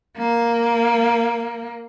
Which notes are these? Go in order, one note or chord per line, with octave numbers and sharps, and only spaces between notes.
A#3